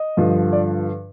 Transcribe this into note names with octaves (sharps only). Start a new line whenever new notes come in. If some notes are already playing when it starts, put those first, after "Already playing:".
Already playing: D#5
G2 D3 F3
D5